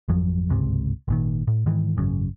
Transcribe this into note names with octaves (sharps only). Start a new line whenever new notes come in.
G#1 F2 F3 F#3
G1 C#2 G#2 C3
G#1 A#2 D#3
A2
G#2 D#3 E3
G#1 F#2 C#3